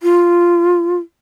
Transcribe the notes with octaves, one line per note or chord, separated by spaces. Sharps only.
F4